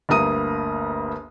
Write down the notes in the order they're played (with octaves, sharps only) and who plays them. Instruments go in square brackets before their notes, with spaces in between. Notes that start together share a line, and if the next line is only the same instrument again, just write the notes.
[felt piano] G1 D2 A#3 A#5 D#6 D#7